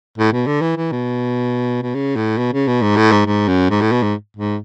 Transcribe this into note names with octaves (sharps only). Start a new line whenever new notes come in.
A2
B2
D3
E3
E3
B2
B2
C#3
A2
B2
C#3
B2
G#2
A2
G#2
G#2
F#2
G#2
A2
B2
G#2
G#2